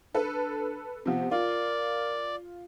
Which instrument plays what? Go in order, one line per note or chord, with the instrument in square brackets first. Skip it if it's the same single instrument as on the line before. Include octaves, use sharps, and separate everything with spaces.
[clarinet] D4 [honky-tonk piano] A4 B4
[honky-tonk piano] C3 F3 [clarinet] B3
[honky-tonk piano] F4 [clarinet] A#4 [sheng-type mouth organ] D5